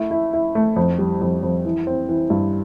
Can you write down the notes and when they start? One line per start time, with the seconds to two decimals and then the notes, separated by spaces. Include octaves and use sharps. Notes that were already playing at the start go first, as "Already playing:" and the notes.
Already playing: A3 E4
0.11 E4
0.33 E4
0.55 A3
0.76 F2
0.99 G3
1.21 F2
1.43 F2
1.65 E3
1.87 C4
2.09 E3
2.30 G2